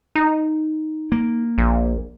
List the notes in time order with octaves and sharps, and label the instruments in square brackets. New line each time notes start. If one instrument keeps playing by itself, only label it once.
[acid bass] D#4
[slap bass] A#3
[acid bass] A#1